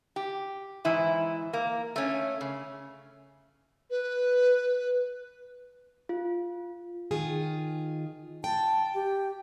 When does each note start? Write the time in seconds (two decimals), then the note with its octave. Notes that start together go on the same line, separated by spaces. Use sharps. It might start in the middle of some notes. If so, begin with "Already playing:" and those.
0.16 G4
0.85 G#2 E3 E4
1.53 A#3
1.96 A3 C#4
2.41 C#3
3.90 B4
6.09 F4
7.11 D#3 F4 G#4
8.44 G5 A5
8.95 G4